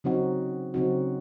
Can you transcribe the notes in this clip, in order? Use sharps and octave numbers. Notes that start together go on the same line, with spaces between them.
C#3 F#3 C4 D#4 F#4
C#3 F#3 C4 D#4 F#4